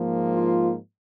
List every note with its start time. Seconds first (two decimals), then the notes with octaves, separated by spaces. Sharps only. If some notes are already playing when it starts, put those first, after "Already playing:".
Already playing: G#2 F3 A#3
0.34 F4